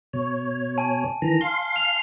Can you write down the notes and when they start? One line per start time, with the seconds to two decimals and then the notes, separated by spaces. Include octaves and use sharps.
0.13 B2 C#5
0.78 G#5 A5
1.22 D#3 E3 A#5
1.41 F5 C6 G7
1.76 F7